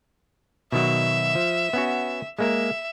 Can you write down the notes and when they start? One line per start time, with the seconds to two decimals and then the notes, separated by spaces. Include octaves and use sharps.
0.72 B2 D#3 F#3 E5
1.35 F3
1.73 B3 C#4 F#4
2.39 G#3 A#3 A#4 E5